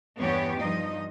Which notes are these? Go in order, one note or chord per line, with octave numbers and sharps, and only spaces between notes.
E2 G2 E3 B3 G4 C#5
G2 F3 D#4 D#5